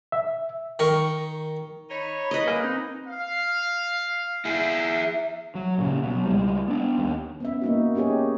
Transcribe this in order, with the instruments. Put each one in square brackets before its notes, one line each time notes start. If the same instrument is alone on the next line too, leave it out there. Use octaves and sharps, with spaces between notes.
[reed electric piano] E5
[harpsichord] D#3 A#4 C#6
[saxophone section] D#4 C#5 [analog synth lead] B5
[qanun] B4 D#5
[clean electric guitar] A#3 G#4
[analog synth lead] C4 [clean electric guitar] D#4
[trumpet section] F5
[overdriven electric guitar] E4 G#4 [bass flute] E5
[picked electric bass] F#3
A#2 C#3
B2 F#3
C#2 G3 G#3
B3 D4
D#2
[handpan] B3 C#4 E5
A#3 D#4 F#4
C#4 D#4 G4 G#4 C#5